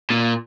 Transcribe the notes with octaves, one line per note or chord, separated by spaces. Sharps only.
A#2